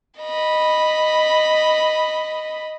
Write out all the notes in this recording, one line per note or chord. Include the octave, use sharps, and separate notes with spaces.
D#5 B5